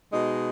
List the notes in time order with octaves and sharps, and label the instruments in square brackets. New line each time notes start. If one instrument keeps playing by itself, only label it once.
[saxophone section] B2 G#3 D#4